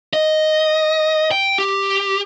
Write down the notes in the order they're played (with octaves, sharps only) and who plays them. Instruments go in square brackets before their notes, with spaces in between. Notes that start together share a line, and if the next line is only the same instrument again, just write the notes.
[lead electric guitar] D#5
G5
G4